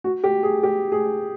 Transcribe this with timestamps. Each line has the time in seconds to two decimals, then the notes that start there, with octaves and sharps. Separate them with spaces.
0.04 F#4
0.24 G4
0.43 G#4
0.63 G4
0.92 G#4